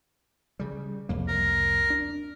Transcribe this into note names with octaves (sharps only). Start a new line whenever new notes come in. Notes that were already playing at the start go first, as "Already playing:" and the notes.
C#3 G3
C2 F2 A#3
A#4
D4